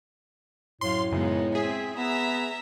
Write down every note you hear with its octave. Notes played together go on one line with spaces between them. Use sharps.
F#2 A2 F5 C6
F#2 C#3 G#3 B3 D#4
C4 G#4 E5
B3 E5 A#5 E6